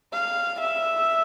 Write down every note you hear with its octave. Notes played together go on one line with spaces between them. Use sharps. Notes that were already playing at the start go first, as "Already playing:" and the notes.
F5
E5